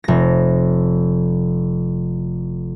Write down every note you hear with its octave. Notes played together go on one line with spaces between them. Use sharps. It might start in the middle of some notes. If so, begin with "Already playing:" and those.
F1 A#6